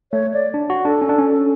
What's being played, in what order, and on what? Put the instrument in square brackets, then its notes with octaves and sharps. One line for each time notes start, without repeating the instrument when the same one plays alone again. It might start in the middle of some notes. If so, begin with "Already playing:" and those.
[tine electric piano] A3 [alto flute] C#5
[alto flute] D5
[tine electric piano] D4
F#4
[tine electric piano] D4 [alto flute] A4
[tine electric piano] C#4
D4
C#4